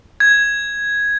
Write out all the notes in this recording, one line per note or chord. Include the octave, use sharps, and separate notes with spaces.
G#6